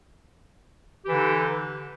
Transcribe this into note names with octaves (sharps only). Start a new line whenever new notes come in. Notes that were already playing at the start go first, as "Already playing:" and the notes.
D3 E3 D#4 G4